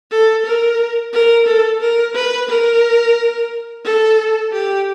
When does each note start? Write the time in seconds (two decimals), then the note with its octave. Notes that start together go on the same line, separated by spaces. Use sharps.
0.11 A4
0.46 A#4
1.13 A#4
1.47 A4
1.81 A#4
2.15 B4
2.49 A#4
3.84 A4
4.52 G4